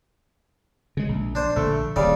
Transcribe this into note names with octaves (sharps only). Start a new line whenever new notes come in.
C#3 G#3
A#1
D4 C5
A#1 D3 A3
D#1 G2 C#3 D5